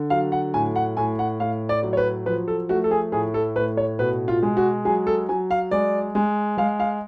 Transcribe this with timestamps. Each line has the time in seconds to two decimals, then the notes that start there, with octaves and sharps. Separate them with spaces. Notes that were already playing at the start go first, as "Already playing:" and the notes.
Already playing: D3
0.10 F#3 F5
0.32 F#5
0.54 A2 G#5
0.76 F#5
0.97 A2 G#5
1.19 F#5
1.40 A2 F5
1.69 D5
1.83 F#3
1.93 C#5
1.97 B4
2.26 F3 B4
2.48 A4
2.69 A3 F#4
2.84 A4
2.91 G#4
3.12 A2 G#4
3.34 A4
3.56 A2 B4
3.77 C#5
3.99 B2 B4
4.28 F4
4.43 G#3
4.57 F#4
4.85 F#3 G#4
5.07 A4
5.29 F#3 G#5
5.51 F5
5.71 G#3 D5
6.15 G#3
6.58 G#3 F5
6.80 F5